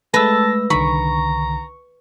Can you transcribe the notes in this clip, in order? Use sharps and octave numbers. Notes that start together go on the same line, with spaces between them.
G#3 A3 B4 A5 E6 A#6
C2 D3 D#3 A#5 B5 C#6